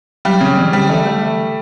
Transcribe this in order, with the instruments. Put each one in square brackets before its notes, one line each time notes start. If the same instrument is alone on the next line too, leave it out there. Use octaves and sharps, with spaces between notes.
[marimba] F#3 [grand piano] G3
[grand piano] C#3
[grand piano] C#3 [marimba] E3
[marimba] D3 [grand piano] G3
[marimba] E3 [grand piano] A3
[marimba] G3 [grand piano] A3
[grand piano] A3